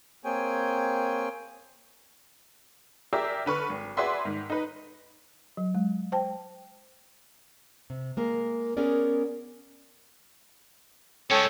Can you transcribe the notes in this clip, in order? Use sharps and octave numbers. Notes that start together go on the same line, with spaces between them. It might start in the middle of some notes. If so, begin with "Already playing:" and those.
A#3 C4 G#4 C#5 G5 G#5
G4 G#4 A#4 D5 E5
D3 B4 C#6 F6
G#1
F#4 G#4 B4 D5 E5 C6
G#2 D#3
D#4 B4
F#3
G#3
C5 G5 A5
C3
G#3 A#3 A#4
B3 C#4 G#4 A#4 D5
G#3 C#4 A4 C#5 G5